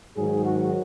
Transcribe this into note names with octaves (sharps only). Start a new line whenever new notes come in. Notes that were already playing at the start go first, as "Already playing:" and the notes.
G#2 D#3 F#3 G#4
F#4